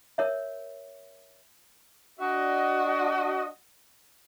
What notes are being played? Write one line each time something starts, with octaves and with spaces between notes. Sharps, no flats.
A#4 C#5 E5
D4 F#4 D#5